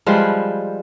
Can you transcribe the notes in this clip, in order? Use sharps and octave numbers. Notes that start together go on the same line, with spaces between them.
F3 G3 G#3 B4